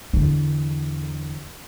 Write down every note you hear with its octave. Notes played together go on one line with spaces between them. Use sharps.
E2 D3